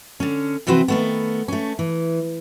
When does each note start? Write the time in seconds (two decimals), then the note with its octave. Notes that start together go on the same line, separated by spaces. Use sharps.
0.20 D3 C#4
0.67 C3 E3 C4 F#4 B4 C5
0.88 D#3 A3 B3
1.48 A3 C#4
1.79 E3